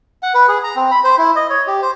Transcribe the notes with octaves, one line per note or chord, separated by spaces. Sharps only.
F#5
B4
G#4
A#5
C4
B5
C5
E4
D#5
C#5
G4
C5